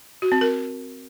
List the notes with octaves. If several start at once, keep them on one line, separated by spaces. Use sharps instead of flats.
F#4
C4
A#4